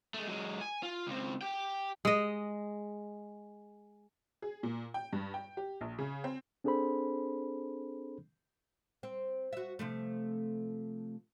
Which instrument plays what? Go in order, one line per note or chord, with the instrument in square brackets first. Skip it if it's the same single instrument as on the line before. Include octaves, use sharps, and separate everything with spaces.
[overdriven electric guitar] G#3 A3
F#3 G#3
G#5
F4
C#2 C4
G4 G5
[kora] G#3 D#5
[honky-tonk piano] G#4
A#2
G5
G2
G5
G4
A#1
C#3
C4
[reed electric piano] C4 D4 G#4 A4 C5 B5
[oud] C4
F#4 E5
C3 F3 A3